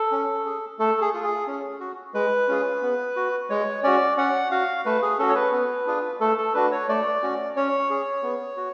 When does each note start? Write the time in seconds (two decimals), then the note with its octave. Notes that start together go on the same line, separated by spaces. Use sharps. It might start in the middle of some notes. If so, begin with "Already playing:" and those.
Already playing: A4
0.12 C#4
0.46 G#4
0.79 A3 A4
1.01 G#4
1.13 F4 G#4
1.24 G#4
1.47 C#4
1.80 F#4
2.14 G#3 B4
2.48 C#4 F4 G#4
2.82 B3
3.16 F#4
3.50 G#3 C#5
3.83 C#4 F#4 D5
4.17 C#4 F#5
4.51 F#4 F5
4.85 A3 B4
5.02 G#4
5.19 C#4 F#4 A4
5.29 C#5
5.35 B4
5.52 B3
5.87 D4 F4 G#4
6.20 A3 A4
6.38 A4
6.54 D4 F#4 B4
6.72 C#5
6.89 A3 D5
7.23 C#4 F#4
7.56 C#4 C#5
7.90 G#4
8.23 B3
8.57 F#4